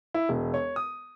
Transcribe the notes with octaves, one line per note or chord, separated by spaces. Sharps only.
E4
E1
C#5
D#6